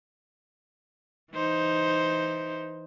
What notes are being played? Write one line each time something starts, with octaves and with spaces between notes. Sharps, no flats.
E3 D#4 C5